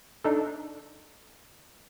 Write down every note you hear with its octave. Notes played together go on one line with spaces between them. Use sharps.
D4 D#4 A4